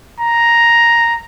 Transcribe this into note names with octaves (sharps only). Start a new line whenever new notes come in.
A#5